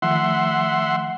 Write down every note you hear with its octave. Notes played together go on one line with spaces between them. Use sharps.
D#3 F3 A3 E5 F#5 C6